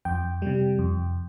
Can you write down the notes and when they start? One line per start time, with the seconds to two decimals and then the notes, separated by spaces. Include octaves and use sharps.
0.05 F2 G5
0.42 C3 G3
0.79 F2